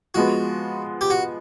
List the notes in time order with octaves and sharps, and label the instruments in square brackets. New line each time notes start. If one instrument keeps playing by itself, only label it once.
[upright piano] F3 G#3 B3 [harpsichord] F#4
[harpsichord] G4
F#4